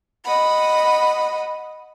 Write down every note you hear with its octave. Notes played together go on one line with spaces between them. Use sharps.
D#5 F#5 B5